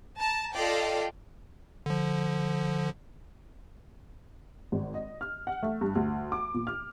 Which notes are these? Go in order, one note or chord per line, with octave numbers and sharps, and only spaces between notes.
A5 A#5
F4 A4 D5 D#5 F5 G5
D3 F3
G#1
D#5
F6
F#5
A3
G2
D2
D6
A#2
F6